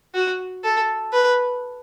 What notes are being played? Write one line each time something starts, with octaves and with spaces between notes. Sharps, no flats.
F#4
A4
B4